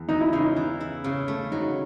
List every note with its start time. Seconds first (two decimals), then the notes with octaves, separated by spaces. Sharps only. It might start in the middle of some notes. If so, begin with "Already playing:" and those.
Already playing: E2
0.09 E3 D#4
0.21 E4
0.33 C#3 D#4
0.56 E3
0.80 E4
1.04 C#3
1.28 A3
1.52 F#3 D#4